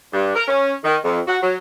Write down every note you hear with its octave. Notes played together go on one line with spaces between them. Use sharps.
G2
A#4
C#4
D#3
F2
F#4
F#3